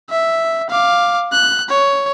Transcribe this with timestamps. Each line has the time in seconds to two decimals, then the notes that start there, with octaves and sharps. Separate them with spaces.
0.10 E5
0.70 F5 D6
1.32 F#6
1.69 C#5